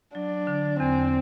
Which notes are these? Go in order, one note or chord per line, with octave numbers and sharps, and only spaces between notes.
F#3 D4
D3
E2 C4